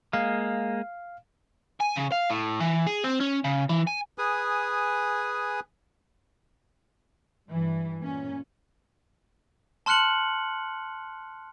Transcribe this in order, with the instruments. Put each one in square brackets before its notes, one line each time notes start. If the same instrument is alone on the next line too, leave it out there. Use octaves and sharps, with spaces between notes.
[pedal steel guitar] G#3 A#3 [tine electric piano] F5
[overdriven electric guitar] G#5
C#3
F5
A2
E3
G#4
C4
C#4
C#3
E3
G#5
[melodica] G#4 B4 G#5 D#6
[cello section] G2 E3
A#2 C#4
[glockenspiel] A5 C6 F6 F#6 C#7 F#7